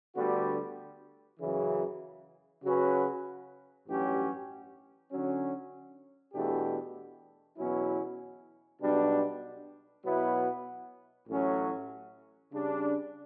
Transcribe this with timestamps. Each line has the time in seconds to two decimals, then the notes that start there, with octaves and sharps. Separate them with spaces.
0.16 D2 D3 G3 B3 F#4
1.39 F#2 C#3 E3
2.63 C#3 F#3 C#4 F#4 B4
3.86 A1 G2 F#3 C#4 G4
5.10 D3 F#3 C#4
6.34 E2 B2 A3 D4 G4
7.58 E2 B2 F#3 C#4 E4
8.81 B1 B2 G3 D4
10.04 B2 F#3 B3 E4
11.28 A1 A2 F#3 C#4
12.52 C#3 G3 D4